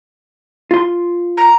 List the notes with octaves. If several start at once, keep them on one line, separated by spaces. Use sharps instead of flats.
F4 C6
A#5